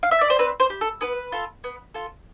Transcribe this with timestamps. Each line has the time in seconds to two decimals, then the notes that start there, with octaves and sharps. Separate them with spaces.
0.03 F5
0.11 E5
0.21 D5
0.30 C5
0.39 C4 B4
0.60 C5
0.70 G4
0.81 A4
1.01 B3 B4
1.32 F4 A4
1.64 B3
1.94 F4 A4